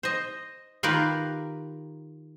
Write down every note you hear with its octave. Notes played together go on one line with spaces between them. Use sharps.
C5 D#5
D#3 F4 G4 A#4 B4 F5